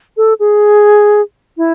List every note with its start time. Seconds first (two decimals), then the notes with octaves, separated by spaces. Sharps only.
0.17 A4
0.40 G#4
1.57 E4